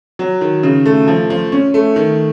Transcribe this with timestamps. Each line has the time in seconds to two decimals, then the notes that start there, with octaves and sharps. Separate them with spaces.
0.19 F#3
0.41 D#3
0.63 C#3
0.86 A3
1.08 F3
1.30 F3
1.52 C#4
1.74 A3
1.96 D#3